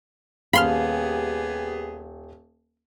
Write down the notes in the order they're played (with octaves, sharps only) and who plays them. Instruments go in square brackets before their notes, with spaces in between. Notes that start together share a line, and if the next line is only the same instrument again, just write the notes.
[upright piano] D#1 [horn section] B3 G4 G#4 [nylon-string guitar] F5 [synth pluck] B5 C6 F6